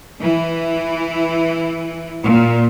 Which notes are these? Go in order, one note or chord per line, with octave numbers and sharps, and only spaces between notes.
E3
A#2